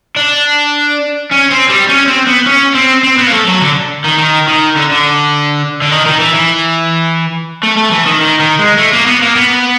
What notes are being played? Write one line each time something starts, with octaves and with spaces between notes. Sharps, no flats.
D4
C#4
C4
G3
C#4
C4
B3
C#4
C4
C4
B3
A#3
A3
F#3
D3
D#3
D#3
D#3
D3
D3
D3
D#3
D#3
E3
E3
A3
A3
E3
D#3
D#3
D#3
G#3
A3
A#3
B3
A#3
B3